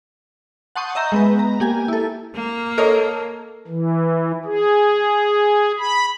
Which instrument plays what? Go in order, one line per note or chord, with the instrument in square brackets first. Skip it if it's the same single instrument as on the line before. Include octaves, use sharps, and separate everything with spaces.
[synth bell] F#5 A5 C6 C#6 D#6 G6
D#5 E5 A#5 G6
G#3 B3 B4
A#5
A#3 G4 G#5
E4 A4
[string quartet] A#3
[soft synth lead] A4 [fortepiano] A#4 C#5 D#5
[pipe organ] E3
G#4
B5